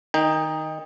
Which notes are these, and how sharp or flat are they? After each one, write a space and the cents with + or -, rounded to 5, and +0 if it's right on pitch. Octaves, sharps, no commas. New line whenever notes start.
D#3 +0 D#4 +0 G5 +25